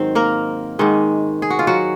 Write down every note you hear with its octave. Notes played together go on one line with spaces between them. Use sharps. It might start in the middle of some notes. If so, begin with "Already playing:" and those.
Already playing: G#2 D#3 F#3 C4 C5
A#3 A#4
G#2 D#3 G#3
G#4
F#4
F4
F#3 F#4